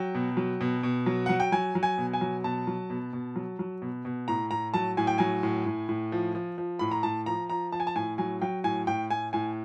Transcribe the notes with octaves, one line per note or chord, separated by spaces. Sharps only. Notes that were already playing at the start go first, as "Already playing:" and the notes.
Already playing: F#3 G5
B2
F#3
B2
B2
F#3
F#3 F#5
G5
F#3 G#5
F#3
G#5
B2
G#5
F#3
B2 A5
F#3
B2
B2
F#3
F#3
B2
B2
A2 A#5
A2 A#5
F#3 A5
A2 G#5
G5
F#3 G#5
A2
A2
A2
F3
F3
F3
A2 B5
A#5
A2 A5
F3 A#5
F3 A#5
F3 A5
G#5
A5
A2 G#5
F#3 G#5
F#3 G5
A2 G#5
A2 G5
A2 G#5
A2 G#5